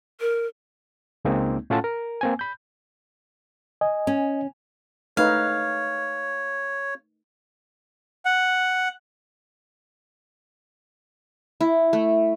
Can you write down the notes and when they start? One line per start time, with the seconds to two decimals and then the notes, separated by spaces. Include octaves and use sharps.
0.20 A#4
1.25 C#2 G#3 A#3 C4 D#4
1.70 A2 C#4 F4 A4 F#5 A5
1.84 A#4
2.21 A#3 C4 G#5
2.39 B5 G6
3.81 D#5 G#5
4.07 C#4
5.17 A3 D#4 B4 C#5 F5
8.25 F#5
11.61 E4
11.93 A3